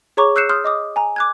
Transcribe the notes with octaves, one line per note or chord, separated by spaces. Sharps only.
G#4 C#5 A#5 C#6 D6
E6 F#6 G6 C7 C#7 E7
C6 D#6 F6 G6
D#5 D6 D#6
G#5 A#5
D6 F#6 G#6